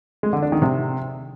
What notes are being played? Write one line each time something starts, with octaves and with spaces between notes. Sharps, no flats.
G#3
D3
D4
D#3
C3